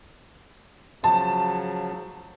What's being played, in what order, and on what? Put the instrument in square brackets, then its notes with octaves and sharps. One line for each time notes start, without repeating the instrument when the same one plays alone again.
[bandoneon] C#3 F3 F#3 [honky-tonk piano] A5